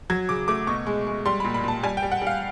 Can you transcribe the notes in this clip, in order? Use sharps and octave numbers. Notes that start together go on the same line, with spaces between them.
F#3 G#6
C#3 D6
A3 D6
B2 C#6
G#3
G#3
G3 C6
B5
A#2
B5
A#2 A5
G3 G#5
G5
G3
F#5
G3
F5